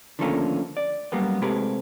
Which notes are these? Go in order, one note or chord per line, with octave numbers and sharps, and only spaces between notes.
D3 D#3 F3 A3 A#3 C#4
D5
F#2 G3 A#3 B3
C3 G#3 A3 G4 A#4 B4